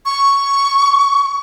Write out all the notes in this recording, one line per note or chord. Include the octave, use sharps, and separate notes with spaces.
C#6